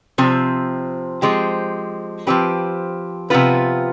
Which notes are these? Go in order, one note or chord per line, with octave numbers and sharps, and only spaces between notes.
C3 F3 C4
F3 G#3 C4 G4
F3 C4 G4 B4
C3 F3 B3 F4 B4